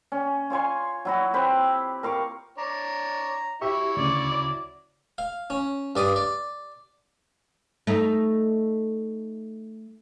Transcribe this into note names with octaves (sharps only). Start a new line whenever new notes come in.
C#4
F4 C#5 G#5 C6
F#3 E4 F#4
C4 G4 B4
A#4 F5 C#6 D6
D4 C#5 A#5
F#3 E4 G4 E5 C#6
D2 C#3 D5
F5
C#4
G2 D5 D#6
D5
A3 D#4